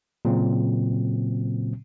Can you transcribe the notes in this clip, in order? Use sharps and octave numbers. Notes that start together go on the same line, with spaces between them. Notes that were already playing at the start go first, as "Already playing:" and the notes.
A#2 C#3 F#3 C4